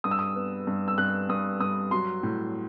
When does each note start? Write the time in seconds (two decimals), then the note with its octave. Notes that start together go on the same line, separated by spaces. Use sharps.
0.04 G2 D#6
0.11 E6
0.19 D#6
0.36 B3
0.67 G2
0.88 E6
0.98 G2 F#6
1.29 G2 D#6
1.60 G2 D#6
1.91 F#3 C6
2.23 A2